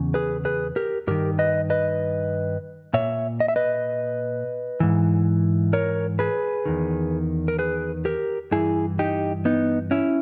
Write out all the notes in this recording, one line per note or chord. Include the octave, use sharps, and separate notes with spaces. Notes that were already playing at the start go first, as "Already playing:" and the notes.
Already playing: E2 C#3
G#4 B4
G#4 B4
G4 A#4
G2 D#3 G4 A#4
B4 D#5
B4 D#5
A#2 C#5 E5
D#5
E5
B4 D#5
G#2 E3
A#4 C#5
G#4 B4
E2 D#3
A#4
G#4 B4
G4 A#4
G2 E3 E4 G#4
D#4 G4
B3 D#4
C#4 E4